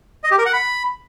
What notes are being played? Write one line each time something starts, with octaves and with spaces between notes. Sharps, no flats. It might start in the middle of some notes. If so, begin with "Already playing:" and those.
D#5
G4
A#4
F#5
B5